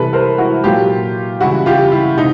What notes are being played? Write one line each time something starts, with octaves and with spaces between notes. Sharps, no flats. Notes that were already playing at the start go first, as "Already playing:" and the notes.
Already playing: C3 E3 G3 A4 B4
A#4 C5
E4 F#4
A#2 F#3 F4 G4
C#3 E3 G3 E4 F#4
F4 G4
E4
C3 D#4